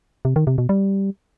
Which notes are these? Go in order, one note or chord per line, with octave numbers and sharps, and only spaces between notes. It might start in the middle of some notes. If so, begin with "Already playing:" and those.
C3
D#3
C3
B2
G3